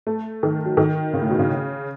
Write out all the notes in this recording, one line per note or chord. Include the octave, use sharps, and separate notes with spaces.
A3
D#3
F#3
D#3
C#3
A2
B2
C#3